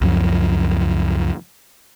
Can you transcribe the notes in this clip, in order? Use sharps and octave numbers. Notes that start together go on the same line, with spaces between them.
C#2 F#2 F3